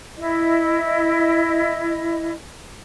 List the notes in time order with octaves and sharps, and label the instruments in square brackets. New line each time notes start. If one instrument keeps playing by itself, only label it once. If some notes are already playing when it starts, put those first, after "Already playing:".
[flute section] E4 D#5